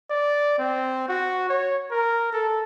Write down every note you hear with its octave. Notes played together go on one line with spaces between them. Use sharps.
D5
C4
F#4
C#5
A#4
A4